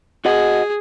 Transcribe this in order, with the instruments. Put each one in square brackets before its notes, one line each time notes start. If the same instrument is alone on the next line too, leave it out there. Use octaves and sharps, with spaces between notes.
[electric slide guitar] F#4 D#5 F#5 [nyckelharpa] G#4